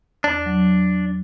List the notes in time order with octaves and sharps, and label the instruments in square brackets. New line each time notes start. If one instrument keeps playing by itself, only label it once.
[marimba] E2 [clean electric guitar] D4
[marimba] F#3